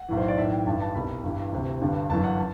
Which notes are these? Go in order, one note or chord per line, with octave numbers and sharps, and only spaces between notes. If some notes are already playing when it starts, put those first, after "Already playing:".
Already playing: F#5
B1 A2 E3
C5
D5
B1 A2 E3 E5
G5
G1 G2 E3 A5
A5
C2 B2 B5
G1 G2 E3
D2 C3 E3
G1 G2 D3
G1 F#2 E3 A5
F#5
A5